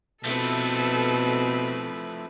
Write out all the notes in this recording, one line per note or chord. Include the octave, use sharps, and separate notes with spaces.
B2 F3 A3 C4 E4 A4 B4